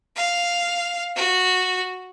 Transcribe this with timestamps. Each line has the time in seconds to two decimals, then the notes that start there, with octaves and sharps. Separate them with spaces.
0.16 F5
1.16 F#4